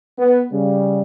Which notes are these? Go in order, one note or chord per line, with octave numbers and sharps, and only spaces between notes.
B3
C#3 G3